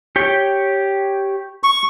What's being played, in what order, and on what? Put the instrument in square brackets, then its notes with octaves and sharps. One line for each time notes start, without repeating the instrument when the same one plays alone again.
[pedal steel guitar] G4 C#5 G5
[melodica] C#6